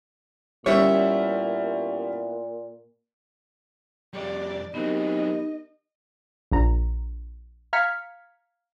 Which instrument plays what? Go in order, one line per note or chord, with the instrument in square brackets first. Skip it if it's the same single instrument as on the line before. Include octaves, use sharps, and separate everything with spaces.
[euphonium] A#2 [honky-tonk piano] G3 C#4 [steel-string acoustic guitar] B3 E4 E5 [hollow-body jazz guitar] C#5
[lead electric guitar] F2 G3 [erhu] D5
[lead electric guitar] F#3 C4 [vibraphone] B3 G4 A#4 [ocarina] D#4 [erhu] D#5
[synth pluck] A#1 A#5
F5 A#5 F6 G#6 B6 C#7